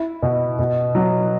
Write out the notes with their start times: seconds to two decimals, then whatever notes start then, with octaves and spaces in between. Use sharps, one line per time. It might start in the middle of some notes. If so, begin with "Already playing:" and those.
Already playing: E4
0.23 B2
0.59 B2
0.95 F#3